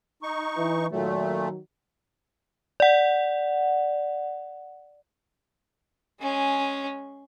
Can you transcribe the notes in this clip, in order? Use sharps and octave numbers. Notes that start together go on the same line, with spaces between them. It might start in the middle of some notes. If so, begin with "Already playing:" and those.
D#4 C#6
E3
A#2 D#3 F#3 A3
D5 F#5
G#3 C#4